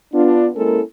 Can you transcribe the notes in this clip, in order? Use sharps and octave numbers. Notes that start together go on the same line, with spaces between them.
B3 D4 F4
G#3 A#3 C#4 E4 A4 A#4